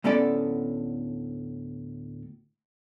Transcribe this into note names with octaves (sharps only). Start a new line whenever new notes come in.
D2 A2 B3 C#4 A4 D5